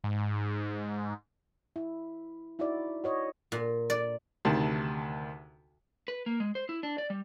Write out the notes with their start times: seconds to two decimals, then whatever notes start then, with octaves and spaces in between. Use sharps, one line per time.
0.04 G#2
1.76 E4
2.59 D#4 E4 F#4 D5
3.04 F#4 C#5 D#5
3.52 A#2
3.90 D5
4.45 D2 C3 D#3 A5
6.08 B4
6.26 A#3
6.40 G#3
6.55 C5
6.69 E4
6.83 D4
6.98 D5
7.10 G3